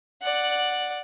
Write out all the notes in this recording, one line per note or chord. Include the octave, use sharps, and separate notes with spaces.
D5 F#5